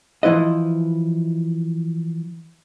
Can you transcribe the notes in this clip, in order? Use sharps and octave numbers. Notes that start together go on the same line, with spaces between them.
E3 F3 E4 B4 D#5